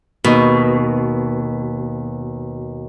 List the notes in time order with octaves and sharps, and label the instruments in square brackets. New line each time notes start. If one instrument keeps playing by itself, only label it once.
[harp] D#2 D#5 [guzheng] B2